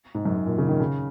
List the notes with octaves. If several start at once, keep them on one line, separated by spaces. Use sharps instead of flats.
G#2
F#2
G#2
A#2
C#3
D#3
C#3